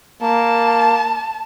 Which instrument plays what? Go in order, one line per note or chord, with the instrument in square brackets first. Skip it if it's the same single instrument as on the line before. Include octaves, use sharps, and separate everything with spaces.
[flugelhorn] A#3 [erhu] A5